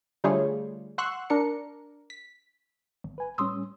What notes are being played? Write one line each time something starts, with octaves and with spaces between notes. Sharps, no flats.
D3 G3 A3 F4 G#4 C#5
F#5 C6 C#6 E6 F#6
D4 A#4 C#7
B6
G#1
B4 G#5
A2 G3 C#4 C6 D#6 E6